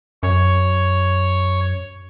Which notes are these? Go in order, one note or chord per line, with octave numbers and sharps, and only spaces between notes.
F#2 C#5